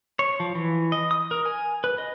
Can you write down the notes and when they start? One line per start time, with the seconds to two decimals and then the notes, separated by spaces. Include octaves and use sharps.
0.19 C#5
0.40 F3
0.55 E3
0.92 D#5
1.11 D#6
1.31 A#4
1.45 G#5
1.84 B4
1.98 D#5